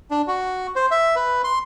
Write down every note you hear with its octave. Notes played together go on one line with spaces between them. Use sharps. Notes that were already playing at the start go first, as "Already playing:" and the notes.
D4
F#4
C5
E5
B4
C6